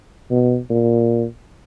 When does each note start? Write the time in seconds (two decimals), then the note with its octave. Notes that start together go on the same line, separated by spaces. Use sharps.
0.30 B2
0.70 A#2